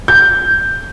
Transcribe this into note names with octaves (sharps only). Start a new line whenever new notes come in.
G6